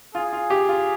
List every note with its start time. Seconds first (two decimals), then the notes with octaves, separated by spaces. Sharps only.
0.15 F4 G#4
0.33 F4
0.50 G4
0.69 F4